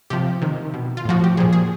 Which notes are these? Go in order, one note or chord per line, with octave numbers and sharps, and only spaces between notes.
C3 F3 G4
C3 D#3
B2
F4
A2 F3 F#4
G4
A#2 F3 G#4
G#4